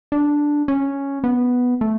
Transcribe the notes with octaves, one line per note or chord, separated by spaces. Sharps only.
D4
C#4
B3
A3